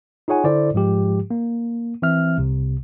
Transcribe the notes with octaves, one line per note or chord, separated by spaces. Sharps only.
D#4 F4 G#4 C#5 F#5 G#5
D3 E4 A4 C5 D5
G#2 F3 G#3 G4
A#3
E3 C4 E5 F6
C2 C3